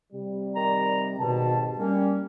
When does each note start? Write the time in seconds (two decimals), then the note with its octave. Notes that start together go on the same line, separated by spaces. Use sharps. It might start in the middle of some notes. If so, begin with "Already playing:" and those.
0.13 C3 G3
0.56 D#3 D5 A#5
1.20 G#1 B2 G4 A5
1.78 G3 A#3 C#4